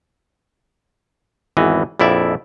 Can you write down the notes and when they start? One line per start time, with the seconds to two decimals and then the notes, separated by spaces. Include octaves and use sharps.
1.57 G#1 E2 E3 D#5
1.99 A#1 F2 E4 D5 E5